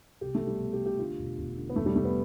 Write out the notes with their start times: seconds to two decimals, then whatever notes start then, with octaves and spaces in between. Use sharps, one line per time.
0.21 C2 G4
0.35 A3
0.42 B2
0.47 G3
0.60 B2
0.73 G4
0.80 B2
0.86 G4
0.99 D3 F4
1.19 E1
1.38 E1
1.57 D3
1.69 B3
1.76 F1 A3
1.86 G3
1.96 F1 A3
2.05 B3